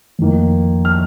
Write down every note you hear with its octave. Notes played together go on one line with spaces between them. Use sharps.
F2 D#3 A#3
F6